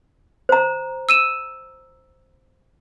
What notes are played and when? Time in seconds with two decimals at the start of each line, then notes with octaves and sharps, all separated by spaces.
0.49 C5 A#5
1.09 E6 D#7 E7